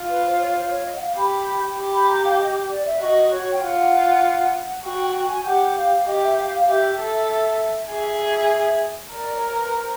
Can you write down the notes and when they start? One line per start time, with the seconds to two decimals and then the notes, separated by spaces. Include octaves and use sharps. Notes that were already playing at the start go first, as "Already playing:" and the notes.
Already playing: F4
0.09 B4
0.24 C5
0.39 C#5
0.55 C5
0.70 C#5
0.85 D#5
0.96 F#5
1.01 F5
1.16 G4 B5
1.77 G4
1.93 B5
2.08 A#5
2.24 F5
2.38 D#5
2.69 D5
2.85 E5
3.00 F#4 D#5
3.31 C#5
3.53 G5
3.61 F4 F#5
4.85 F#4 G5
5.05 G5
5.25 G#5
5.45 G4 F#5
5.76 F5
6.07 G4 D#5
6.23 E5
6.37 F5
6.53 F5
6.68 G4 E5
6.99 A4
7.91 G#4 E5
9.13 A#4 D5
9.35 C#5
9.55 B4
9.75 C5